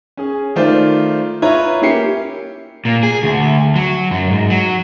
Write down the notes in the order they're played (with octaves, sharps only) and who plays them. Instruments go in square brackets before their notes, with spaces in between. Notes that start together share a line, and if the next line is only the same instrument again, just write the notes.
[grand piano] C#4 G#4
D#3 A3 F4 C5 D5
E4 F4 B4 C#5 A#5
A#3 C#4 E4 G4 C7 C#7
[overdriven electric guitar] A#2
G#4
D2
F#3
F#2
G#2
F#3